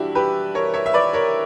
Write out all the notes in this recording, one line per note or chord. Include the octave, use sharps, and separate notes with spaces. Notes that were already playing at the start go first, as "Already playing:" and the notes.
Already playing: G2 E3 D4 E4 F#4 G4
G4 B4
A#4 C#5
C#5 E5
E5
B4 D5
A#4 C#5